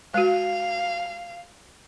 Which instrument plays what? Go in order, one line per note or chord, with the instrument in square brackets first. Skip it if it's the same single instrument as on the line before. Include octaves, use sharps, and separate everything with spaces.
[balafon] G#3 F#4 [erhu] F5